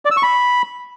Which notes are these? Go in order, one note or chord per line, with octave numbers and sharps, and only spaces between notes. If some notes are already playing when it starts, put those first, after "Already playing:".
D5
E6
C#6
B5